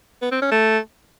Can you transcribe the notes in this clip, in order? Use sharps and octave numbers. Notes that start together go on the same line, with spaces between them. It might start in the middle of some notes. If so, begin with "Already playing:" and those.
B3
C4
C#4
A3